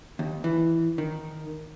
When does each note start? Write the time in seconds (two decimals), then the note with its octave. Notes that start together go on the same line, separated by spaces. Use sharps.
0.19 D#2
0.44 E3
0.98 D#3